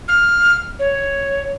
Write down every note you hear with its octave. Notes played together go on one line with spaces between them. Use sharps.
F6
C#5